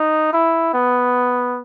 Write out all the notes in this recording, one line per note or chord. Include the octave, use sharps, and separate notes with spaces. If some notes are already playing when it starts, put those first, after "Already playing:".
Already playing: D#4
E4
B3